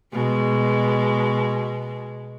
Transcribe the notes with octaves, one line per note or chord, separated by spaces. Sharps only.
B2 G#3